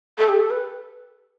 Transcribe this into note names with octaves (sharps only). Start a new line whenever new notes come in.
A4
G4
A4
B4